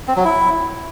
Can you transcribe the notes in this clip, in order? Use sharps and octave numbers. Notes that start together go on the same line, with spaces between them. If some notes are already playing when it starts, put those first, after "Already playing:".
C4
F#3
E4